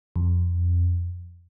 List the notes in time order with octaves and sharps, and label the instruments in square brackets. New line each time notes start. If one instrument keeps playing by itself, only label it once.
[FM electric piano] F2